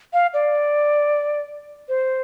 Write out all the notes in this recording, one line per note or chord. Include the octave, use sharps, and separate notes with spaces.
F5
D5
C5